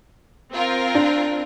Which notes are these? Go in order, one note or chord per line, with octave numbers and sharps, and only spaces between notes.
C4 F4 A#4
D4